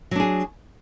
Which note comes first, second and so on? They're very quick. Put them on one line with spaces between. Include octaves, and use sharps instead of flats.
F#3 D4 G#4